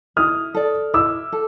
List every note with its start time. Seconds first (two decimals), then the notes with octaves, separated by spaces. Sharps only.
0.16 E4 D#6 F6
0.54 A4 D5
0.93 E4 D6 E6
1.32 A4